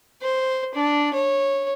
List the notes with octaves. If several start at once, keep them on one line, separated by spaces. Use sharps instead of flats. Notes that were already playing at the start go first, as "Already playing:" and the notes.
C5
D4
C#5